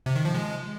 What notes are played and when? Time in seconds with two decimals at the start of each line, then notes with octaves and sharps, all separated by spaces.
0.06 C3
0.16 D#3
0.25 F3
0.35 G#3